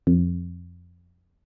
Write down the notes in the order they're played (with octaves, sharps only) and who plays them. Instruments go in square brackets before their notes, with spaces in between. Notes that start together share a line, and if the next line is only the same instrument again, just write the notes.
[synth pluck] F2